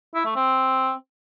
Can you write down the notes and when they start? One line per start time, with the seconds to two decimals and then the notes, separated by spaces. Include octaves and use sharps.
0.15 E4
0.25 A3
0.36 C4